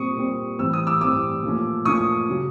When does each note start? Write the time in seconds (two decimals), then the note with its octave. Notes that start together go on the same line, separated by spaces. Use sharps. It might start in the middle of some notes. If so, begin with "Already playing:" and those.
Already playing: A#2 G3 C4 C#6 D#6
0.17 A#2 G3 C4
0.59 A2 E3 G3 C4 E6
0.73 D#6
0.87 D6 E6
1.01 A2 E3 G3 C4 D6 E6
1.43 A#2 F3 A3 C#4
1.85 A#2 F3 A3 C#4 C#6 D#6
2.30 C#3 F#3